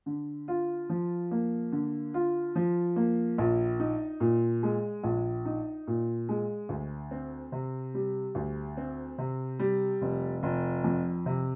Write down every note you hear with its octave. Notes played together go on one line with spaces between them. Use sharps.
D3
F4
F3
A#3
D3
F4
F3
A#3
A#1
D#4
A#2
G#3
A#1
D#4
A#2
G#3
D2
C4
C3
G3
D2
C4
C3
G3
F1
F1
F2
C3